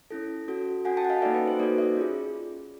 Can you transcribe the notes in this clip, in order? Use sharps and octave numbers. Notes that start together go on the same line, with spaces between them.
C#4 E4 A4
C#4 F#4 A4
C#4 F#4 A4 F#5 G#5
G5 A5
F#5
D#5 F5
A#3 D#4 F#4 A4 D5 E5
B4
C5
A#3 D#4 F#4 A4 C5 D5
D5 E5
C#4 F4 G#4